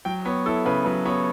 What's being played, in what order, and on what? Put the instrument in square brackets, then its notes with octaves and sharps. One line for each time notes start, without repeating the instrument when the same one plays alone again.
[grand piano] F#3 G5
B3 C#5
E4 A4
C#3 B4
F#3 B4
B3 C#5